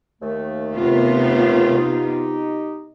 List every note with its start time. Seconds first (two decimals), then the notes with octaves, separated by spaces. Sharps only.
0.22 D#2 A3
0.75 C3 B3 F4
1.77 D#4 G4